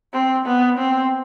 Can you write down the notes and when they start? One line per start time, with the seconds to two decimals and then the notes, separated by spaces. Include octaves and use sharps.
0.13 C4
0.46 B3
0.78 C4